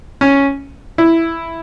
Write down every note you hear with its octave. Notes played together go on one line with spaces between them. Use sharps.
C#4
E4